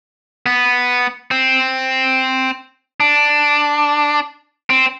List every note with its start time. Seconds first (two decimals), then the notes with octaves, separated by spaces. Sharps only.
0.46 B3
1.31 C4
3.00 D4
4.70 C4